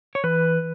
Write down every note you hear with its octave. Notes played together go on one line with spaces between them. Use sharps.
C#5
E3 B4